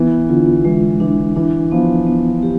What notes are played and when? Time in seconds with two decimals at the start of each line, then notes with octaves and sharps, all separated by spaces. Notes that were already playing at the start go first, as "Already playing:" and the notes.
Already playing: E3 B3
0.29 D3 F4
0.65 E3 G#3
1.00 E3 D4
1.36 E3 D4
1.71 F3 B3
2.07 B3
2.43 G4